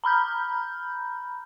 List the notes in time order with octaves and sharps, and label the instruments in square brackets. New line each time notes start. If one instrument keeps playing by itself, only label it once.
[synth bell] A#5 B5 F6 G6